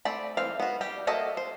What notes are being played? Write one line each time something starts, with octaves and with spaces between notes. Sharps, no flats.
A3 C4 D5 B5
E3 C4 F5
B3 F#4
G3 G4
A#3 F#4 A4 D#5 E5
C5